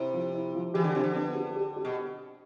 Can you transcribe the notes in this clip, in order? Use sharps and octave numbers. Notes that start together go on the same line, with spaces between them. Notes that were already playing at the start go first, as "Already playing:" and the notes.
Already playing: C3 E4
F3
E4
F3
E3 G4
D3
C3 F3
D3
B3
G4
G4
G4
B2